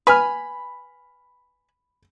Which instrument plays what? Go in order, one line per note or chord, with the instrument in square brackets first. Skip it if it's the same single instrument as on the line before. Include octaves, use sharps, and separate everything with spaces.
[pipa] B4 G#5 [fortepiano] B5 F6